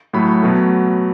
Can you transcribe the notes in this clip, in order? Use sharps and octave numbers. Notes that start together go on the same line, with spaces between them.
A2 F#3 A3 B5
B2 F#3 A3